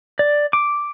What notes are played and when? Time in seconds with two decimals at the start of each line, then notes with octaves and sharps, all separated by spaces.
0.19 D5
0.53 D6